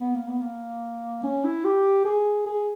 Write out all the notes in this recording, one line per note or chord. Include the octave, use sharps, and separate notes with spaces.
B3
A#3
B3
A#3
C#4
E4
G4
G#4
G#4